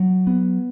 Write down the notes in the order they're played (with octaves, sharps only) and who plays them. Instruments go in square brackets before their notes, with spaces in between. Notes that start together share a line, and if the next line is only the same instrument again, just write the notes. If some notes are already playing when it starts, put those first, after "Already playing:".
Already playing: [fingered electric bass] F#3
B3